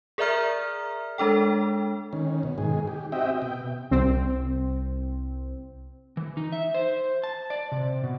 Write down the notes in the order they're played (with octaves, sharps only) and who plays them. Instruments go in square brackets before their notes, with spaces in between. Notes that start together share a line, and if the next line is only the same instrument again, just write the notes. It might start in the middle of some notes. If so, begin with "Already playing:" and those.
[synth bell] G#4 A#4 D5 E5 A#5 F6
G#3 D4 A4 G5
[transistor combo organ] D#3 C#4
B2
G#2 D#3 G#4
G4
C4 F#4 G4 D#5 E5 G5
B2 G5
[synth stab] C2 C4
[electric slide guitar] E3
D#4
E5
C5
A5
D5
C3
B2